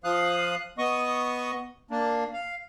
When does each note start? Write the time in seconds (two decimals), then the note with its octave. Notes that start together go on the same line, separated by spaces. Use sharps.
0.04 F3 F5 D#6 F#6
0.78 B3 D#5 C#6 D#6
1.91 A#3 D4
2.33 F5